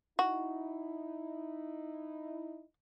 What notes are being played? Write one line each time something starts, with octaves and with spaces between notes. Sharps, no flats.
D#4 E4 F#4